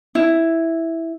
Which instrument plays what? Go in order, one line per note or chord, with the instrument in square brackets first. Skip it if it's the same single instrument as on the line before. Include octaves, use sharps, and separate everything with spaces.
[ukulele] E4